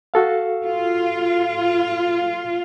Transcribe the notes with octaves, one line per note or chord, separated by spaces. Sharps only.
F#4 A4 F5
F4